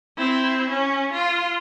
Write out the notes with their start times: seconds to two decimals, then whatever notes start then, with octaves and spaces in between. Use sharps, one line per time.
0.17 C4 E4
0.70 C#4
1.13 F4